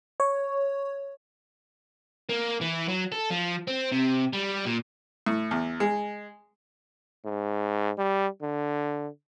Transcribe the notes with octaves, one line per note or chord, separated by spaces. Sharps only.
C#5
A#3
E3
F#3
A4
F3
C4
C3
G3
A#2
A2
E2
G#3
G#2
G3
D3